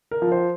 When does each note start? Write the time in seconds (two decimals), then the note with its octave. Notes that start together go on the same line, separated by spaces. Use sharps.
0.11 A#4
0.22 F3
0.32 C5